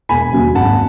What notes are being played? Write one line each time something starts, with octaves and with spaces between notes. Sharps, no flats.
E1 G#5 B5
D#2 C#3 F#3
G#1 F#5 A5